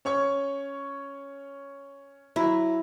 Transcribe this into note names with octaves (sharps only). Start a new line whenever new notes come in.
C#4 C#5 C#6
F#3 E4